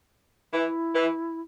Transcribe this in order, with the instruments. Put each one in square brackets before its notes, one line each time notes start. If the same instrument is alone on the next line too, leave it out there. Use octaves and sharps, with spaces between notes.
[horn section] E3 [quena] E4
[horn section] E3